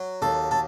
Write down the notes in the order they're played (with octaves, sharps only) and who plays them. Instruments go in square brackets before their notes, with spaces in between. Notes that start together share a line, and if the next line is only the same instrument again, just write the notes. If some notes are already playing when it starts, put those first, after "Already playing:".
Already playing: [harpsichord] F#3
D#2 A4
A4